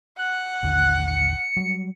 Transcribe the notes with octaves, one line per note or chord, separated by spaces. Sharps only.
F#5 F#6
A1 D#2 D3
C#7
F#3 G3